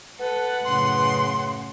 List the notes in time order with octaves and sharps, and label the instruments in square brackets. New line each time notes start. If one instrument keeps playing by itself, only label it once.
[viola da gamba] A4 [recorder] B4 [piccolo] F#5
[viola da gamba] F#2 A2 C#3 [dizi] C6